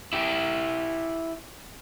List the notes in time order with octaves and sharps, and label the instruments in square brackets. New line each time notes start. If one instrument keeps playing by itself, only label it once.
[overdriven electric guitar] E4 G4